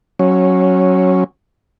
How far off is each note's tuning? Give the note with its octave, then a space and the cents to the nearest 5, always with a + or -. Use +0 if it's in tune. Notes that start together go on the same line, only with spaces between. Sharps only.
F#3 +0 C#4 -10